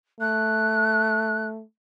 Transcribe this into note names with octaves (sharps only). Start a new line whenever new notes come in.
A3 F#6